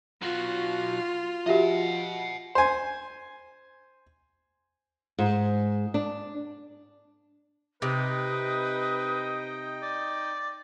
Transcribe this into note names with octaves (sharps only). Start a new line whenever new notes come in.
B1 F4 F#4
F3 F#4 G4 D#5 E5 F#5
C5 G#5
G#2
D4
C3 D#4 B4 D#5 G5 D#6
D5